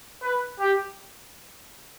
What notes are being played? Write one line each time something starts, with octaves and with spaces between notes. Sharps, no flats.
B4
G4